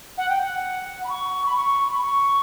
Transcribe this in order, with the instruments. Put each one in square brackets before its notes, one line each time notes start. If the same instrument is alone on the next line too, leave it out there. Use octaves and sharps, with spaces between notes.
[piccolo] F#5
G5
F#5
B5
C#6
B5
C#6
B5
C#6